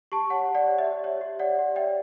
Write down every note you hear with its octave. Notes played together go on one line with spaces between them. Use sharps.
G4 A5 C#6
C#5 F#5 A5
G4
D5 F#5
C#5
E5
G4
C#5 E5
G4
C#5 D5 F#5
G4
D5 E5 G5